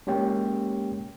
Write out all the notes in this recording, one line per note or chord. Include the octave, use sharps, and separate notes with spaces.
G#3 A#3 C#4 G4 C#5 G5